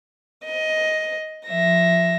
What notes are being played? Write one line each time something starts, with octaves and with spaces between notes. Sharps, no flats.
D#5
F3 E5 A#6